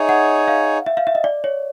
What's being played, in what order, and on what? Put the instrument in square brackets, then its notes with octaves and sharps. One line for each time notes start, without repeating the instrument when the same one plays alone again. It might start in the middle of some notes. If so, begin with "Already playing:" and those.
Already playing: [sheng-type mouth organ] D#4 G#4 C#5 [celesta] E5
[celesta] F#5
F5
E5
F5
E5
D#5
D5
C#5